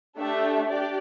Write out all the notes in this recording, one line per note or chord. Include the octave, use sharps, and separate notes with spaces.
A3 D4 G4 E5
D4 G4 D5